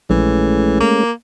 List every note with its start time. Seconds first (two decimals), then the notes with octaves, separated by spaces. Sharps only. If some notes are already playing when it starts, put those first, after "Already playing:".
0.10 A#1 E3 G#3 A3 C#4
0.80 A#3